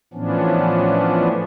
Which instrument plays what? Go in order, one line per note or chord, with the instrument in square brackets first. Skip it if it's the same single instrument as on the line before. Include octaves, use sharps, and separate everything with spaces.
[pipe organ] A2 E3 F3 B3 C#4 D4